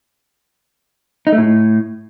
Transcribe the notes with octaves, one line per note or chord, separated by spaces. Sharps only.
D#4
A3
A2